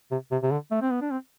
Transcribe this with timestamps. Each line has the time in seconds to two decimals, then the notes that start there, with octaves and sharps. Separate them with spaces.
0.11 C3
0.31 C3
0.43 C3
0.51 D3
0.71 A3
0.82 C4
0.91 B3
1.01 D4
1.11 C4